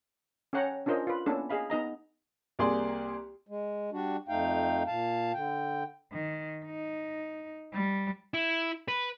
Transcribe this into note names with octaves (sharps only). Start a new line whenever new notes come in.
C#4 A4 C#5 F#5 G5 A#5
C#4 D4 F4 A#4 C5 D#5
F4 B4
A#3 B3 C#4 D4 E4 A4
G#4 D#5 F5 B5
B3 D#4 D#5 A#5
C2 A#3 G#4 D5 C6
G#3
G3 D4 F#4
F2 A3 D#4 F5 G5
A#2 F5 A5
D3 G5
D#3
D#4
G3
E4
B4